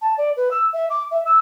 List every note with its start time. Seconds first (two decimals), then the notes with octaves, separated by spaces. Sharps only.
0.02 A5
0.18 D5
0.37 B4
0.51 E6
0.73 E5
0.90 D6
1.11 E5
1.26 E6